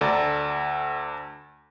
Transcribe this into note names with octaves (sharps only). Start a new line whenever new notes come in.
D2 A4 D5 A#5